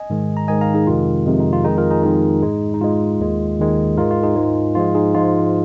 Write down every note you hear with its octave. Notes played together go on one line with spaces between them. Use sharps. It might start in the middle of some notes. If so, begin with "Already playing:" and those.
Already playing: D#5 G#5
G#2 D#3 G#3
A#5
G#2 D#3 G#3 D#5 G#5
F5 A#5
D#4 G#4
F2 C3 D#3 G#3 F4
F2 C3 D#3 G#3
D#4
F4
F2 D#3 G#3 D#4 G#4
F4 A#4
D#4 G#4
F2 D#3 G#3 D#4
G#2 G#3
D#4
G#2 G#3 F4
D#2 D#3 G#3
D#2 D#3 G#3
G#2 G#3 F4 A#4
F4
D#4 G#4
G#2 G#3
G#2 F3 G#3 F4
D#4 G#4
G#2 F3 G#3 F4